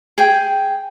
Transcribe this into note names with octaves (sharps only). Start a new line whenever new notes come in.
G#4 G5